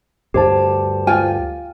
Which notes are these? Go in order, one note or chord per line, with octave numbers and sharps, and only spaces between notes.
D2 G2 G4 C5 A5
F4 G5 G#5